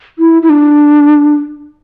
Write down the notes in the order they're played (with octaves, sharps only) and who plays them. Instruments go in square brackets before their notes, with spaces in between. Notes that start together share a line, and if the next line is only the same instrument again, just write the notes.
[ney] E4
E4
D4